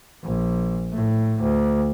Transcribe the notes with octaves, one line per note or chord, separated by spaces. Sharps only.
A#1
A2
D2